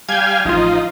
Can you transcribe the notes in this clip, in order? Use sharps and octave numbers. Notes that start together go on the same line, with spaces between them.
G3 F5 G#5 G6 G#6
A1 F3 D#4 F4